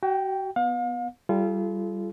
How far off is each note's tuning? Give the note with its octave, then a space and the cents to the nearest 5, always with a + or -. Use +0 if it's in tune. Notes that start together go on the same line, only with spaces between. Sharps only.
F#4 +35 G5 +0
B3 +0 F5 +40
G3 -10 F4 -30 A4 -45